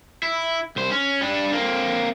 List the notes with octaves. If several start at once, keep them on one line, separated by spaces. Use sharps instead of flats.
E4
C2 C5
C#4
G3 D4
A#3 C4